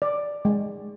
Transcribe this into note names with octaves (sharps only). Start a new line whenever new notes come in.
D5
G#3